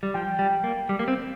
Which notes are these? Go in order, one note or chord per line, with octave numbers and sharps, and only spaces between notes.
G3
F3 G5
G3
A#3
G3
A#3
C4